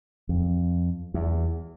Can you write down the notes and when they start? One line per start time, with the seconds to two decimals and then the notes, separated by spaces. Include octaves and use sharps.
0.29 F2
1.14 E2